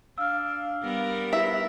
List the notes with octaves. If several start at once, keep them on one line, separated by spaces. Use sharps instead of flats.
D4 F5 E6 F6
G3 B3 A#4
E4 G4 B4 E5 B6